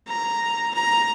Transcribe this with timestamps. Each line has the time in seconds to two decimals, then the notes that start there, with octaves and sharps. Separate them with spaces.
0.08 A#5
0.75 A#5